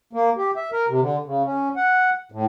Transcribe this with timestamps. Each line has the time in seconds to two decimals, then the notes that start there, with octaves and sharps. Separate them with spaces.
0.13 A#3
0.37 G4
0.56 E5
0.72 A#4
0.88 C3
1.00 D3
1.26 C#3
1.45 C#4
1.76 F#5
2.32 A2